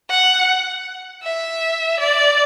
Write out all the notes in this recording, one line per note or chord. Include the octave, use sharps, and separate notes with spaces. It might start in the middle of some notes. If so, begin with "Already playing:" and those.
F#5
E5
D5